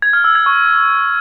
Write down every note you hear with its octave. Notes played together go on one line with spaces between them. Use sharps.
G#6
F6
E6
G#6
C#6